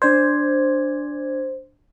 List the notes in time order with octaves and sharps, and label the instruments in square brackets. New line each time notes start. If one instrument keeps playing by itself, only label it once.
[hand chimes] D4 D5 G#6 [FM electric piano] C5